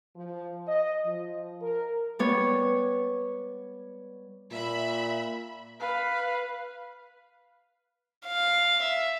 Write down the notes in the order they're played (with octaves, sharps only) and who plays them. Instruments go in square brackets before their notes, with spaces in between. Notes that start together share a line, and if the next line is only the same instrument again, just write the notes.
[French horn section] F3
D#5
F3
A#4
[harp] G3 B3 C#5
[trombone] A#2 [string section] E5 B5
[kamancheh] B4 F5
[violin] F5
E5